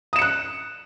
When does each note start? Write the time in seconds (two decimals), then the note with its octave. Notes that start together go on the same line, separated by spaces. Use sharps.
0.13 D#6
0.16 E7
0.19 C#7
0.22 F#6